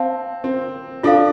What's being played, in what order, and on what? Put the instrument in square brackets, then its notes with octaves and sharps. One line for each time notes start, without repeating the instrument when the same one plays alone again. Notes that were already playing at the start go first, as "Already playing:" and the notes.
Already playing: [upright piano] C4 [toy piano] F5 A5
[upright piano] C4
[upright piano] D4 [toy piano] F4 A4 F5